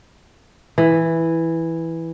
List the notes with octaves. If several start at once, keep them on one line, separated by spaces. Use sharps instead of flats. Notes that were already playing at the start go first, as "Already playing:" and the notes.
E3